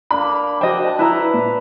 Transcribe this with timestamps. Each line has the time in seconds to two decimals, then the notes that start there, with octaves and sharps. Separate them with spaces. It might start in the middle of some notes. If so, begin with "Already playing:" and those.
0.11 A#3 D4 B5
0.61 F#4 C5 D#5 G5
0.86 A5
0.99 E4 B4 E5 A#5
1.34 A#2